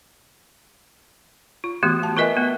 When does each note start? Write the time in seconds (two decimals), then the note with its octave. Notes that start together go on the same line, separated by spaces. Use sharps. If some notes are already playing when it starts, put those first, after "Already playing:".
1.64 F4
1.83 E3 A3 B3 F#4 G4
2.03 A5
2.17 F4 A#4 B4 D#5 E5 G#5
2.37 A3 B3